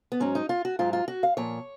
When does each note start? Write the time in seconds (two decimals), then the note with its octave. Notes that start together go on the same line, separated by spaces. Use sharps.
0.12 B3
0.20 G#2 F#3 C#4
0.35 D#4
0.49 F4
0.65 F#4
0.79 G#2 F#3 F4
0.93 F4
1.08 F#4
1.23 F5
1.37 A#2 F3 C#5